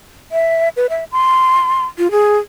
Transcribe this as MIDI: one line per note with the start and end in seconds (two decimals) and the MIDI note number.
0.32 0.69 76
0.76 0.87 71
0.90 1.04 76
1.12 1.85 84
1.98 2.11 65
2.11 2.38 68